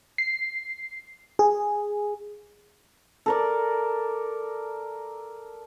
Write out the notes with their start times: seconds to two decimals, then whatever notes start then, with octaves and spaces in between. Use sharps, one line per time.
0.18 C7
1.39 G#4
3.26 A4 A#4 D5